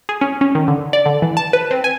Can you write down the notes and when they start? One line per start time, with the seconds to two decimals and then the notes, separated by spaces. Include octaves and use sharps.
0.09 G#4
0.21 C#4
0.41 C#4
0.55 D#3
0.68 D3
0.93 D5
1.06 D3
1.22 E3
1.37 A5
1.53 B4
1.71 C4
1.84 G#5